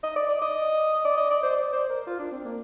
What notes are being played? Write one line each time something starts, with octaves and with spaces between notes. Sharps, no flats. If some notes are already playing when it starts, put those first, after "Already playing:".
D#5
D5
D5
D#5
D5
D#5
D5
C5
D5
C5
A#4
F4
D4
C4
A#3